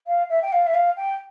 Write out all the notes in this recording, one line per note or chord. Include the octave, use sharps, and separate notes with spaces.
F5
E5
G5
F5
E5
F5
G5